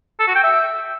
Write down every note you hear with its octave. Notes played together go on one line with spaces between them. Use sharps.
A4
F#4
G5
E5